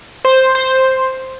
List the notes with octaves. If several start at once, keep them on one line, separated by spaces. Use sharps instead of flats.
C5
C5